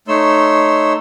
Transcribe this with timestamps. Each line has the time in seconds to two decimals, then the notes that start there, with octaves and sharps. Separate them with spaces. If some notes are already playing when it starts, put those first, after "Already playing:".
0.08 A3 D#4 C#5 C6 E6